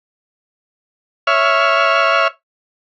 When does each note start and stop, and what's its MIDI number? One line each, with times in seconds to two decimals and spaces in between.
1.27 2.28 73
1.27 2.28 76
1.27 2.28 89